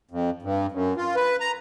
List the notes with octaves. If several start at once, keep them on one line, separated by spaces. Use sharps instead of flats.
F2
G2
F#2
F4
B4
A#5